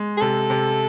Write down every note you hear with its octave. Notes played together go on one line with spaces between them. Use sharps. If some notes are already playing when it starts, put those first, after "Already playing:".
Already playing: G#3
G#4
C3 A4
C3